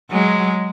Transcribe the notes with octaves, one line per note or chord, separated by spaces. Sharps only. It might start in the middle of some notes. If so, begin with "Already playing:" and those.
F#3 G#3